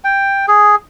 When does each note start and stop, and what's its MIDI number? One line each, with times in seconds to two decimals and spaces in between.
0.04 0.46 79
0.48 0.75 68